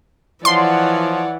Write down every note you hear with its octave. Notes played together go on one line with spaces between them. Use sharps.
E3 F3 C#5 D5 F#5 C6